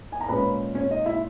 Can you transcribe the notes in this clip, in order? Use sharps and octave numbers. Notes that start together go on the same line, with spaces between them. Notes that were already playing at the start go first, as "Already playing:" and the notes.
G#5
A#5
A#2 G#3 C#4 B4 B5
C#4 C#5
D#4 D#5
E4 E5